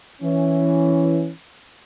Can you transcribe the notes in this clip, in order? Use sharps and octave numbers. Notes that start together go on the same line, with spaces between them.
E3 C#4